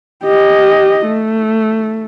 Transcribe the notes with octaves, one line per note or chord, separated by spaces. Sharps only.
G4 D#5
A3